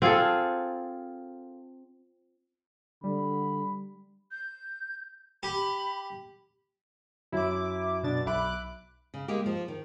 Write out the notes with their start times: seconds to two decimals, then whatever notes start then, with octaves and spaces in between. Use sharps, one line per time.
0.02 C4 F4 G#4 A4
3.04 D3 G3 B5
4.31 G6
5.43 G4 B5
7.32 F#2 E4 E5 D6
8.03 B2 D4 A6
8.26 B1 E5 B5 D6 F#6
9.14 C#3
9.28 G#3 A#3 D#4 G4
9.46 F3
9.68 D#3